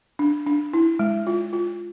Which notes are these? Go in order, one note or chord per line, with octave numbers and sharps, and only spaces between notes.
D4
D4
E4
G#3
F4
F4